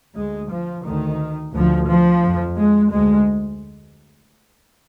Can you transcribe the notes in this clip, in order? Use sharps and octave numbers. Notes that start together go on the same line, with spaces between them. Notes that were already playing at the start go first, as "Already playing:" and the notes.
D2 G#3
F3
D2 D#3
D2 F3
F3
F2
G#3
D2 G#3